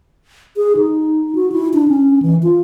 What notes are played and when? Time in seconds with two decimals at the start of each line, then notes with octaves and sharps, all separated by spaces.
0.57 G#4
0.77 D#4
1.35 F#4
1.52 E4
1.74 D4
1.88 C#4
2.22 E3
2.43 F4